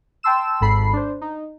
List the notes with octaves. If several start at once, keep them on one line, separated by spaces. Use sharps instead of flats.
G5 A5 C6 E6 E7
G#1 G#2 A4 B5 C7
D4 C5
D#4